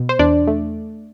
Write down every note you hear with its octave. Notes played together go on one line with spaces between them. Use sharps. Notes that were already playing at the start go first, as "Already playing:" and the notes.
Already playing: B2
C5
E2 D4 D5
A3